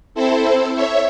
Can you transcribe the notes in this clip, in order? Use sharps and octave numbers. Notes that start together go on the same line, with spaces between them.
C4 E4 A4 C5
C#5 E5